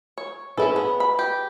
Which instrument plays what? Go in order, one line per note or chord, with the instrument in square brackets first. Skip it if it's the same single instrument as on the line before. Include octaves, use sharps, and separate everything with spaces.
[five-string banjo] C#5
[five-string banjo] C#4 E4 A4 [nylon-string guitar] G#4 B4
[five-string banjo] B3
B5
G4